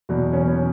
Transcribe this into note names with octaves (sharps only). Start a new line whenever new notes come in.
E2 B2 F#3 B3
C#4
B3
C#4